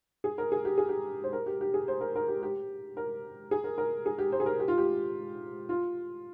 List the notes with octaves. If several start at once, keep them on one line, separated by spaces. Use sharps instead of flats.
G#4
A#4
G#4
G4
G#4
G4
C5
A#4
G4
G4
G#4
C5
A#4
A#4
G4
G4
A#4
G#4
A#4
A#4
G#4
G4
C5
G#4
A#4
G4
F4
G4
F4